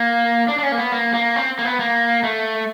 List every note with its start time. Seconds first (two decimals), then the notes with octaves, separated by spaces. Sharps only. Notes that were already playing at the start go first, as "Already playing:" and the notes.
Already playing: A#3
0.48 D4
0.58 D4
0.63 C#4
0.72 A#3
0.78 B3
0.92 A#3
1.14 A#3
1.36 C4
1.59 A#3
1.65 B3
1.80 A#3
2.24 A3